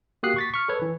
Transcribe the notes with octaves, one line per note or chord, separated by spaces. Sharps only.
A#3 F#4 G4 D#6 F#6 C7
C#6 A6 B6
C#6 F6
A4 B4 C#5
E3